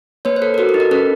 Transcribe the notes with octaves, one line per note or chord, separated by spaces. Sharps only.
A#3 B4 C#5
C5
A4 B4
A#4
F#4 A4 B4
A#4
D#4
A#4
C#4 A4 B4